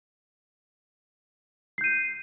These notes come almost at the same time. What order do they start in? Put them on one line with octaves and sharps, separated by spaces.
C7 G6 D#7